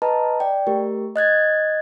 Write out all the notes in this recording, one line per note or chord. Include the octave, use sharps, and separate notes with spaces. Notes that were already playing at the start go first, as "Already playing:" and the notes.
B4 D#5 A5 A#5
D5 G5
A3 G4 A#4
D#5 F#6 G#6 A6